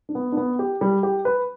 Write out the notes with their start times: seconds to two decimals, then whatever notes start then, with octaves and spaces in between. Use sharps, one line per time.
0.09 D4
0.15 B3
0.32 D4
0.37 B3
0.59 G4
0.81 G3
1.03 G4
1.25 B4